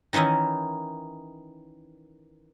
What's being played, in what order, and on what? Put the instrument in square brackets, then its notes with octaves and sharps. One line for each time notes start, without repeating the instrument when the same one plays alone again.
[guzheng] D#3 E3 C#4 D#4 E4